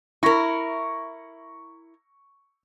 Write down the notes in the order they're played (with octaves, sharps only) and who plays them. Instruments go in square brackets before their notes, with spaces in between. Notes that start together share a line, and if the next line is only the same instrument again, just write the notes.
[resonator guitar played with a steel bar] E4 A#4 [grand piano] C#6 A#6